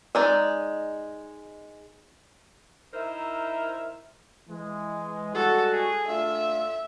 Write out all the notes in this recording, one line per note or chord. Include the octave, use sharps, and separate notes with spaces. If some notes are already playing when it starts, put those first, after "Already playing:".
G#3 D#4 D5
D#4 E4 A#4 C5 E5
E3 G#3
G3 G#3 F#4 A4
G#4
A3 D4 F4 E5